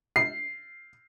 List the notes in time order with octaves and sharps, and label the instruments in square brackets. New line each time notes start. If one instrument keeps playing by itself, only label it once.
[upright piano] C7